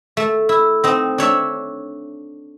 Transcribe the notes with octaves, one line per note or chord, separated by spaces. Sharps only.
A3
E4
C4 D#4
D4 C#5 E5